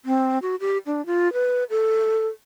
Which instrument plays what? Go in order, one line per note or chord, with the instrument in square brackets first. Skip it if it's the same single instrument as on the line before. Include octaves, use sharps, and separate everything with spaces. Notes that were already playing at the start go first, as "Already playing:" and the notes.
[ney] C4
F#4
G4
D4
F4
B4
A4